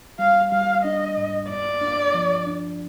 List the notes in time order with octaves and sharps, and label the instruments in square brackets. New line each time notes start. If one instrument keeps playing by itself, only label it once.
[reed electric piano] G3 [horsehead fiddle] F5
[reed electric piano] G3 [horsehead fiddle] F5
[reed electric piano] D4 [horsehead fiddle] D#5
[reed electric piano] G#2
[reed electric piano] G2 [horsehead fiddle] D5
[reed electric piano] D4
F3
D4